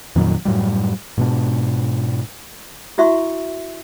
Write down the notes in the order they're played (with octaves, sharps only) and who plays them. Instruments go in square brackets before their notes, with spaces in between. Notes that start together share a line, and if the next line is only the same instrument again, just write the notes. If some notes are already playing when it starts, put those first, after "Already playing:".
[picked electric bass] F2 A#2 D#3 F#3
F#2 A2 F#3 G3
G#2 B2 D4
[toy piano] E4 F#4 E5 C6 C#6